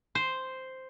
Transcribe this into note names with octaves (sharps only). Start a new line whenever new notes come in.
C5